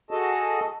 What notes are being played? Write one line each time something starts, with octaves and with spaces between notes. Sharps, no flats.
F#4 G#4 A4 D#5 A5